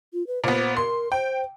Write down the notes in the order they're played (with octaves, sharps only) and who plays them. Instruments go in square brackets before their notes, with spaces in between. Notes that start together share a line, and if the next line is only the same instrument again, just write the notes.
[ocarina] F4
B4
[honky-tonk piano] A#2 B3 [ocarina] C5
[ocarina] A#4 [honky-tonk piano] C6
[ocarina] C5 [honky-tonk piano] G5